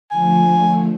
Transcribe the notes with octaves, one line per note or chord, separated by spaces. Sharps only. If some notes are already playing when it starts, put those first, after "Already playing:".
D3 F3 A3 G#5